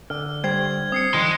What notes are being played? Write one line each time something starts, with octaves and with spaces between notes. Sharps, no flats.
D3 F6
G3 C5 G#6
C4 D#6 C7 C#7
D3 D#3 F3 D#5 C6 C#7